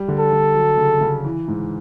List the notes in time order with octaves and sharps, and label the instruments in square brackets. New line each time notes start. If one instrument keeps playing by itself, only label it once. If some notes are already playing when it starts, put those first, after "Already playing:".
Already playing: [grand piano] G3
D3
[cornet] A4
[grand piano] D3
F#3
C#3
C#3
E3
G#2